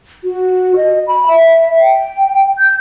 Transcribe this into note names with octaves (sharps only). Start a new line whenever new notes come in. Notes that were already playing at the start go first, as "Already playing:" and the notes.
F#4
D#5
B5
E5
G5
G6